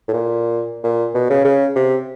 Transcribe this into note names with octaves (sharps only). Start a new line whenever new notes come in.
A2
A#2
A#2
B2
C#3
C#3
C3